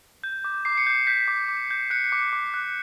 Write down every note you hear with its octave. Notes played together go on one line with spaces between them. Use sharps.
G6
D6
D6 C7
C#7
G6 C7
G6 B6
D6
D6
G6
F#6 C#7
D6
D6
F#6